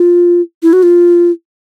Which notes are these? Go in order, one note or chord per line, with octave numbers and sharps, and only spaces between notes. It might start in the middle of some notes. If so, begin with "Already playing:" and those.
Already playing: F4
E4
F#4
F4